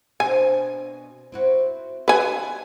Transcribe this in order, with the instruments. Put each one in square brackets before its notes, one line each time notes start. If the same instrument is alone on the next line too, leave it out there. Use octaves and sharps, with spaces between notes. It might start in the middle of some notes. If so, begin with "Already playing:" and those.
[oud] B2 C4 D4 [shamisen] G#5
[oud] C4 E4 F#4
[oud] D4 [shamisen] B4 G#5